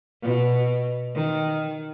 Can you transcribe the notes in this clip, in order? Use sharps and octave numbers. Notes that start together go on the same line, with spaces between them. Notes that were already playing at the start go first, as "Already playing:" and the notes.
B2
D#3